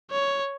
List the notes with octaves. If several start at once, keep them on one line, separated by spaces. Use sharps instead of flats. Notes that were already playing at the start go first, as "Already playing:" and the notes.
C#5